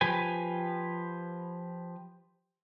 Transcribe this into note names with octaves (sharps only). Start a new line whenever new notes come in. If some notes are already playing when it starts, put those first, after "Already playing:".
F3 G4 B4 G#5